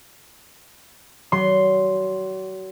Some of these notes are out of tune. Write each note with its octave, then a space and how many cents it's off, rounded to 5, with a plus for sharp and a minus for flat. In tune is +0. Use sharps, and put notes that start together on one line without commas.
F#3 +35 C6 +0